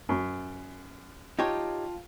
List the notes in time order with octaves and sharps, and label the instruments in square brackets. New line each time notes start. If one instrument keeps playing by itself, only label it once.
[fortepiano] F#2
[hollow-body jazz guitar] D#4 G4 C#5 [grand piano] F4 G5 A5